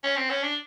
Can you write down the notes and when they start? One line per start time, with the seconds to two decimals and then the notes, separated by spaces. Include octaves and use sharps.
0.04 C#4
0.16 C4
0.30 C#4
0.43 D4